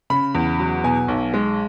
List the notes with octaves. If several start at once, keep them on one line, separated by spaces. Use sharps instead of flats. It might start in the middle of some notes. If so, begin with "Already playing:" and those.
C#3 B5
E2
F#3
B2 G#5
B1
G#3